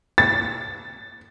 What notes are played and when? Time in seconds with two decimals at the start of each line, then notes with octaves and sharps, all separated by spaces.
0.18 A6